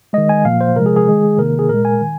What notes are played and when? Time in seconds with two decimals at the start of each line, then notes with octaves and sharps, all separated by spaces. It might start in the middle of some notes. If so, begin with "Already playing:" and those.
0.13 D#3 G#3 D#5
0.29 G#5
0.45 A#2 F3 A#3 F5
0.61 C5
0.76 C3 F3 G#3 A#4
0.86 G#4
0.96 G#4
1.07 D#3 G#3
1.38 C3 D#3 A#3 A#4
1.59 G#4
1.69 A#2 G#3 A#4
1.85 G#5
2.01 D#3